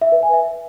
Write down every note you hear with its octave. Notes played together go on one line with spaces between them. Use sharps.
E5
B4
G#5
E5